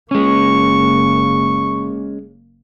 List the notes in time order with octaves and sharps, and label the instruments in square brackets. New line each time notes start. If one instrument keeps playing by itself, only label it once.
[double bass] F#1 A#3 [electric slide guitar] G#3 C#4 [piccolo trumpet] C#6